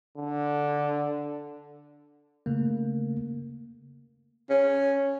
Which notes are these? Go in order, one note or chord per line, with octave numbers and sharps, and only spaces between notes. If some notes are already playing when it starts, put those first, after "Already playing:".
D3
C#3 A3 A#3
C#4